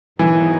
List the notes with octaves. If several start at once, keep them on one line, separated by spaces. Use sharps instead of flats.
G#2 D#3 E3 F#3 B3 D#4